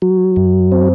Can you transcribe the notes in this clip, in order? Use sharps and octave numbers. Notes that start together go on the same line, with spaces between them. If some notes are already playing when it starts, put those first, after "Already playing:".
F#3
F#2
C4